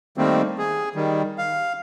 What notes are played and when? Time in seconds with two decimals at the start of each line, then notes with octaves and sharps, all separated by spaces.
0.18 D#3 G3 A3 A#3 C4
0.58 G#4
0.95 D#3 G3
1.38 F5